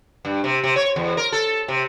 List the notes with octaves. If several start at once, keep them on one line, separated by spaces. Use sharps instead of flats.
G2
C3
C3
C#5
E2
A#4
A4
C3